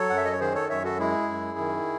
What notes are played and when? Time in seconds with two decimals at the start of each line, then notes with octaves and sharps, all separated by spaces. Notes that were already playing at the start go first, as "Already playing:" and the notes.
Already playing: F#3 A4 C#5
0.10 F#2 F#5
0.17 E5
0.25 D#5
0.32 C#5
0.40 D#3 G#4 C5
0.55 A4 C#5
0.69 F#2 C#5 E5
0.84 F#4 A4
0.99 G#3 E4 G#4
1.29 F#2
1.58 D#3